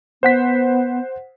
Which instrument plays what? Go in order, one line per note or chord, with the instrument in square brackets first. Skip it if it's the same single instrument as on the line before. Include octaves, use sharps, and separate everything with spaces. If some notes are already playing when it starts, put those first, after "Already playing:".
[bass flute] B3 [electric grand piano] C5 F#5 B6